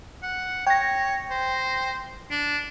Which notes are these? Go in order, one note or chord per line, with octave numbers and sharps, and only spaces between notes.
F#5
C#5 G5 A#6
C5
D4